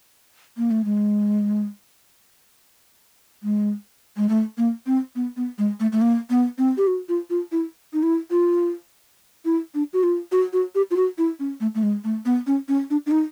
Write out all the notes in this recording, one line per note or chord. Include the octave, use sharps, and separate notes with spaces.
A#3
A3
G#3
G#3
G#3
A3
A#3
C4
B3
B3
G#3
A3
A3
A#3
B3
C4
G4
F#4
F4
F4
E4
D#4
E4
F4
E4
D4
F#4
F4
F#4
F#4
G4
F4
F#4
E4
C#4
A3
A3
G#3
A3
B3
C#4
C#4
D4
D4
D#4